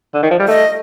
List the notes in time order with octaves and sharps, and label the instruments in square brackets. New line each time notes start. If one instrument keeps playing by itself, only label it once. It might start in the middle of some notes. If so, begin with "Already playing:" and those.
[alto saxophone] D3
D#3
F3
G3
[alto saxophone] A3 [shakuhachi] D#5